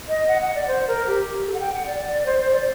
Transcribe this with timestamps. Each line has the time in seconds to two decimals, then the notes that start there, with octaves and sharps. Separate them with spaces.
0.09 D#5
0.28 F#5
0.42 F#5
0.55 D5
0.68 C5
0.88 A#4
1.07 G4
1.47 A4
1.54 F#5
1.60 G5
1.74 F#5
1.86 D5
2.06 D5
2.26 C5
2.39 C5
2.53 D5